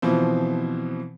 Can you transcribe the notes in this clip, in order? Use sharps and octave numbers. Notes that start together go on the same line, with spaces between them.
B2 E3 F3 C4